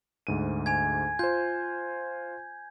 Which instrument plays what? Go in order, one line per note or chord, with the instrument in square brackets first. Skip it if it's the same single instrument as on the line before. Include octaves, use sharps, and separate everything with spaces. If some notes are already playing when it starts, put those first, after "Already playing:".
[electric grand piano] D2 G#2 D#7
[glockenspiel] G#5 G#6
[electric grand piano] F4 C5 [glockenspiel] G6